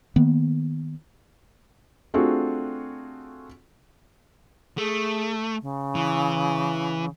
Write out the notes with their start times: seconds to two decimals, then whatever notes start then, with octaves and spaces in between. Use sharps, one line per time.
0.16 D#3 A#3 B3
2.14 A3 C4 D4 F4 F#4 G#4
4.78 A3 G#4
5.62 C#3
5.95 E3